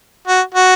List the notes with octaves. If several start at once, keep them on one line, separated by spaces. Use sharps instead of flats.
F#4
F#4